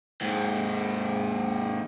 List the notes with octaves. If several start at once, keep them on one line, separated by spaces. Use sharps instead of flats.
D#2 G#2